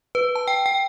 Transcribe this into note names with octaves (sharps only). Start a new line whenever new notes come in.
B4
A5
G5
G5